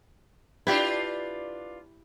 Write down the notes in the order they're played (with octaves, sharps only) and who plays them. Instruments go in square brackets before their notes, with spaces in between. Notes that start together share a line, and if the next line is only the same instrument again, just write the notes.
[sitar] D4 F4 B4 [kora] E4 G4 D5